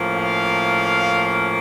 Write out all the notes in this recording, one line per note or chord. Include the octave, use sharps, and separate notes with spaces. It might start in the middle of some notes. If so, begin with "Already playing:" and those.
Already playing: A2 F3 A#3 C#4
F5